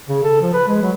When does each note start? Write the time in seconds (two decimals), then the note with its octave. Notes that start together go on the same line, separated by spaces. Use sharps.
0.09 C#3
0.24 A4
0.42 F3
0.54 B4
0.67 G#3
0.82 F#3